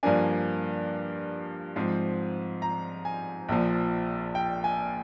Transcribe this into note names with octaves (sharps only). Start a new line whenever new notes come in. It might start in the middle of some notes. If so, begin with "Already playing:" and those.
G2 F3 A#3 D4 G#5
G#2 F3 C4
A#5
G#5
A#1 A#2 F3
G5
G#5